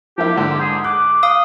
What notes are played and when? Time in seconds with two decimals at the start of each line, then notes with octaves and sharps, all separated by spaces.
0.18 F3 A#3 E4 G4
0.36 G#2 D3
0.61 G#4
0.84 D6 F#6
1.23 F5 D#6